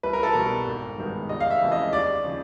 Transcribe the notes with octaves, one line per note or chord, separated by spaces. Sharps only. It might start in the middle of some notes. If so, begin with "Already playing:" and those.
C2 B4
A#4
A4
B2 G3 A#4
G#1
G2 D#3 G#3 B3
F1 D#5
F5
E5
F2 C#3 E3 G#3
D#5
D#2 D5
C#3 F3